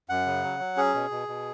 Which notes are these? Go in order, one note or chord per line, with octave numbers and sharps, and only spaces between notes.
F#2 F#5
C#3
F#3
F#3
C#4 G#4
B2
B2
B2